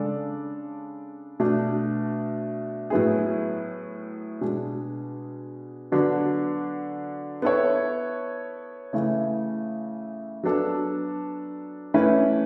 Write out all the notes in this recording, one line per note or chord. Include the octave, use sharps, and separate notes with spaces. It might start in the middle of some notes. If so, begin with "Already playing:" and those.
Already playing: C#3 G#3 D4 A4 D5
B2 A3 D4
A2 F#3 B3 E4 G#4
B2 G#3 D4 G#4
D3 F#3 B3 D4 F#4
B3 E4 A4 C#5
C#3 E3 A3 E4
F#3 B3 D4 A4
E3 A3 C#4 E4 B4